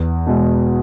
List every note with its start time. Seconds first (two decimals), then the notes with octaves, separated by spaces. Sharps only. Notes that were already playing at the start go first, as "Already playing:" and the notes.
Already playing: E2
0.27 B2 G#3